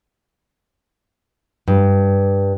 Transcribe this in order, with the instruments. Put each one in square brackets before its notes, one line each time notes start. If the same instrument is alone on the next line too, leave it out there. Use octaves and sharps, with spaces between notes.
[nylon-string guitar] G2